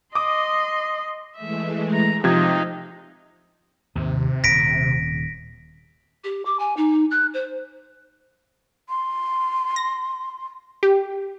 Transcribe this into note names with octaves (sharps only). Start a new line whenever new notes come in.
D#5 C6 D6 D#6
E3 G#3 A3 E5
A#5
C3 F3 D#4 F5 G#6
D#2 G#2 C3 D#3
D#1 A#6 B6 D7
G4
D6
G#5
D#4
F#6
C5
C6
A#6
G4